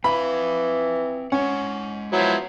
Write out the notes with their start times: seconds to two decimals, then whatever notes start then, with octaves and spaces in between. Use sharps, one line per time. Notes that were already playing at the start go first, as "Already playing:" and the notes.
0.04 E3 C4 F5 B5
1.32 G#3 C#4 F#5
2.13 F3 F#3 B3 E4